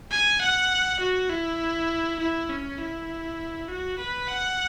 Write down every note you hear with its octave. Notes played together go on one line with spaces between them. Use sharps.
G#5
F#5
F#4
E4
E4
C#4
E4
F#4
B4
F#5